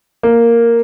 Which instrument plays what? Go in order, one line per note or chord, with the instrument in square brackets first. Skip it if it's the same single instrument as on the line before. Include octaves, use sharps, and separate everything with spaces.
[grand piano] A#3